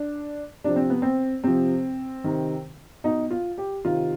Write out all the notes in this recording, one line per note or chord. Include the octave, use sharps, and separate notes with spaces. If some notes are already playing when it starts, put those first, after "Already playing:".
Already playing: D4
C3 F3 D4
C4
B3
C4
C3 F3 C4
C3 D#3
B2 D#4
F4
G4
C3 D#3 F4